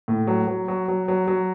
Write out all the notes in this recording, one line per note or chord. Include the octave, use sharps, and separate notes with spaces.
A2
F#3
F#3
F#3
F#3
F#3
F#3